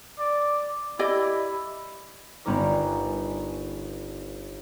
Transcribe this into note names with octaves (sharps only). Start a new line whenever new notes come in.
D5
E4 G4 D5 D#5
G1 B3 C#4 D#4 A#4 D6